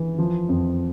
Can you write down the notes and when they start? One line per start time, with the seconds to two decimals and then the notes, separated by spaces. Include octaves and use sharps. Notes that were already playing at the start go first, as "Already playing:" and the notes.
Already playing: E3
0.18 F3
0.49 F2